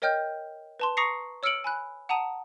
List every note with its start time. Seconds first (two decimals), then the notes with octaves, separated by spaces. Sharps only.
0.02 A#4 C#5 D#5 G5 F6 G6
0.80 B4 A5 C6
0.97 A#5 C#6 D#6 A#6 C7 C#7
1.43 C#5 E6 F6 C#7 D7 F#7
1.64 G#5 B5 F#6
2.09 F#5 A5 A#5 D#6 D#7